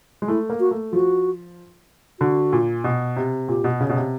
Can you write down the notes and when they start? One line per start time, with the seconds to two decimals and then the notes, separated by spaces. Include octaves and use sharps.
0.22 G#3
0.28 A3 E4
0.50 A#3
0.60 F#4
0.71 A3
0.92 F3 F#4
2.20 D3 F#4
2.53 A#2
2.84 B2
3.17 C3
3.48 A#2 G4
3.64 B2
3.81 C#3
3.89 B2
3.97 C3